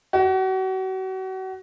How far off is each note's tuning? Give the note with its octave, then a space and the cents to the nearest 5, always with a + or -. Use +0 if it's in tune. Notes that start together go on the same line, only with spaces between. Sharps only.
F#4 +35